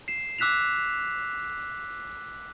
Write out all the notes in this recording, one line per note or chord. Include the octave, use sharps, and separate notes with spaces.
C7 E7
D6 E6 F#6 B6 E7 F7